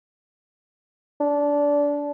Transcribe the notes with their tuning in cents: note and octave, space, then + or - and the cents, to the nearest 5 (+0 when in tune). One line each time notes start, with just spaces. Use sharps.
D4 -20